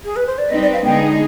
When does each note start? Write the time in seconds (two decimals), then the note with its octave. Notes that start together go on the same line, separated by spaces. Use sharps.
0.04 G#4
0.16 B4
0.26 C5
0.38 D5
0.50 G3 C4 D#4 B4 D#5
0.62 D5
0.73 F5
0.84 D3 G#3 B3 D#4 G#4 G5